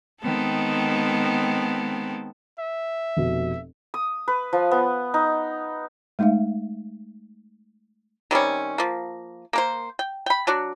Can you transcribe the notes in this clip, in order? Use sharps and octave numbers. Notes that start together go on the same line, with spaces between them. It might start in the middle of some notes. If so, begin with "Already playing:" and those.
D#3 G#3 B3 C4 A4
E5
F1 B2
D#6
B4
F3
B3
D#4
G#3 A3 D#4 E5 F5
D#3 G3 C4 C#4
F3 A#3
A#3 A#4 C5
G5
G5 B5
F#3 D4 F#4